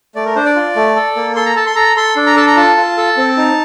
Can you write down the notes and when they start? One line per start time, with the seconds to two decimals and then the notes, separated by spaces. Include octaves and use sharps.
0.15 A3 D5
0.26 A#4
0.35 D4 C5
0.45 D5
0.56 F4
0.76 A3
0.96 A4
1.16 A#3
1.36 A4 C6
1.46 A#5
1.56 A4 A5
1.66 C6
1.76 A4 A#5
1.96 A4 C6
2.16 D4
2.26 A#5
2.36 A4 A5
2.47 A#5
2.56 F4 A5
2.77 F4
2.97 A4
3.17 C4
3.37 D#4